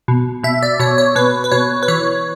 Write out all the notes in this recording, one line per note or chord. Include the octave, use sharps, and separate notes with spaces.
B2
B2 E5
D5
B2 C#5
C#5
B2 B4
B4
B2 C#5
B4
E3 C#5